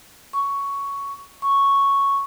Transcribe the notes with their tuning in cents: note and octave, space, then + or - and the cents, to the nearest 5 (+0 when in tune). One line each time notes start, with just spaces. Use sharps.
C#6 +10
C#6 +0